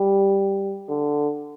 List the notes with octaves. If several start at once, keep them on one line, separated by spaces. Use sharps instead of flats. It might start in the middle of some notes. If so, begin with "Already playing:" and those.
Already playing: G3
D3